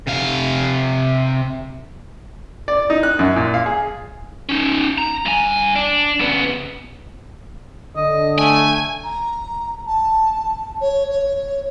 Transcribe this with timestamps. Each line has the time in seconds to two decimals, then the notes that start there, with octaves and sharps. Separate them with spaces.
0.07 C3 F5
2.68 D5
2.90 D#4
3.03 F#6
3.19 F#2
3.36 A#2
3.54 F5
3.66 G#4
4.49 C#4 D#4
4.98 A#5
5.26 G2 G#5
5.76 D4
6.20 C#3 B3
7.96 D3 D#5
8.39 A3 G#5
9.04 A#5
9.86 A5
10.81 C#5
11.10 C#5